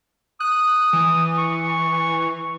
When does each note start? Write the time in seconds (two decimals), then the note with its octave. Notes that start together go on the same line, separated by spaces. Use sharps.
0.40 D#6 F#6
0.93 E3
1.38 C#6